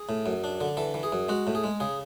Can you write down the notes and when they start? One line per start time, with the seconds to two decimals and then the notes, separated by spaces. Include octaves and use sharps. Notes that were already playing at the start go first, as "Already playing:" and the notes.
Already playing: G#4
0.09 A2
0.26 F#2
0.44 D4
0.61 D3
0.77 E3 A4
0.94 E3
1.03 G#4
1.12 F#2
1.28 G#3 F#4
1.47 A2
1.55 G#4
1.64 G#3
1.80 C#3 G#4